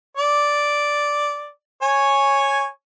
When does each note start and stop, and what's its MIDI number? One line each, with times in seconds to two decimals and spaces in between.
0.17 1.50 74
1.82 2.67 73
1.82 2.67 80